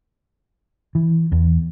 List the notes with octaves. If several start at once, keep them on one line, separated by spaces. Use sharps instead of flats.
E3
E2